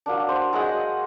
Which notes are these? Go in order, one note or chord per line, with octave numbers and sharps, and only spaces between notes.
F#3 A#3 D4
C5
F#3 G#3 D#5 F#5